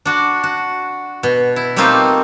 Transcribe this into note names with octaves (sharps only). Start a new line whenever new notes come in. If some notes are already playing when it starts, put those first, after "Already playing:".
D4 F#4
F#4
B2
E4
G3 A3 A#3 C4 D#4 F4